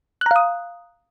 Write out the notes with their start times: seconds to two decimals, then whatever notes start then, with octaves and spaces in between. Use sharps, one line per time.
0.21 F#6
0.26 A#5
0.31 F5
0.36 D#6